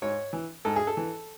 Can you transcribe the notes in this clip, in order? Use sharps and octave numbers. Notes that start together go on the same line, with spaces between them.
G#2 C#5
E3
G#2 A4
G#4
A4
E3